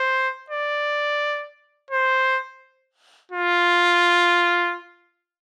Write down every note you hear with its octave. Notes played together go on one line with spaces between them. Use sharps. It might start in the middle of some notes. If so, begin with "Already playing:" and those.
Already playing: C5
D5
C5
F4